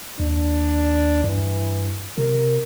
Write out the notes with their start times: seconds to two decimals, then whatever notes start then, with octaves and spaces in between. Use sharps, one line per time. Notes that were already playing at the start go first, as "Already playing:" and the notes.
0.20 D#2 D4
1.24 G2 E3
2.18 C3 A#4